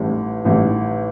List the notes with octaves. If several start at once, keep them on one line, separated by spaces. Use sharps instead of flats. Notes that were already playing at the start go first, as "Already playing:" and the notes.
Already playing: A1 A2 G3
A1 A2 G3